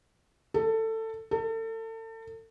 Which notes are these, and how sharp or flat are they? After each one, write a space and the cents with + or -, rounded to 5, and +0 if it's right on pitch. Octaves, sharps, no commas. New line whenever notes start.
A4 +20
A4 +35